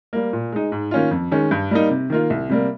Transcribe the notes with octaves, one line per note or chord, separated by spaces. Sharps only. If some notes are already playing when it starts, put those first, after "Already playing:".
G3 A#3
A#2
G#3 D#4
G#2
D#3 A#3 C#4 F4
F2
D#3 G#3 C#4
G2
G3 A#3 D#4
C3
D#3 A#3 F4
C2
C3 G3 A#3